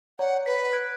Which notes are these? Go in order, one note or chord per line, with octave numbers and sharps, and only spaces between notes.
C#5 D5 F#5 A#5
B4 B6
F#6 G#6 D7